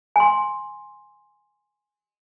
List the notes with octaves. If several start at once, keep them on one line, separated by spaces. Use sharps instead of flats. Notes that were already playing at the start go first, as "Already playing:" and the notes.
G#5 C6